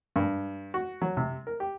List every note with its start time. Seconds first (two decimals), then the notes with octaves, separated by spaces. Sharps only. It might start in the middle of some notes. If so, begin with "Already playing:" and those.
0.16 G2
0.74 F#4
1.02 F#3
1.17 C3
1.47 A#4
1.60 G4